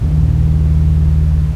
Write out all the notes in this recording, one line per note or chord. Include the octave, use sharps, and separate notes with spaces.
A#1 D#2